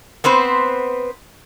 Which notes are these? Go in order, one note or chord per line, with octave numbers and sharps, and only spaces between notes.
B3 C4 B4 C5